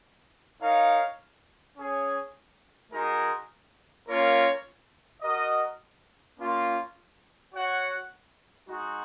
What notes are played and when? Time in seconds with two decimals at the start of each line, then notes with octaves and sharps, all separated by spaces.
0.62 D#4 A#4 C#5 F5
1.77 C#4 G#4 C#5
2.92 G#3 D#4 F#4 A#4
4.08 A#3 C#4 F4 A#4 C#5
5.22 F#4 A#4 D#5
6.39 A#3 C#4 F4
7.54 F#4 C#5 F#5
8.69 G#3 D#4 F#4